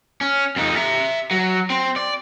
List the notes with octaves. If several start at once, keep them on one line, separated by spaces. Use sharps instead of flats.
C#4
F2 D#4
E5 A#5
F#3
C4
D5